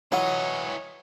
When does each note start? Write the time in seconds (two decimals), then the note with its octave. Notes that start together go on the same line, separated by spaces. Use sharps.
0.12 E3 F#3 E4 F4 C#5 D#5 F#5